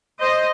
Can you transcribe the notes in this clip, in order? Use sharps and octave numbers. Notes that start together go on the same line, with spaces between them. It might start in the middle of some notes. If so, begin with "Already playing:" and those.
C5 D#5